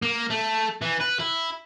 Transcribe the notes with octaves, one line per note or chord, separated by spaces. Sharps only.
A#3
A3
E3
B4
E4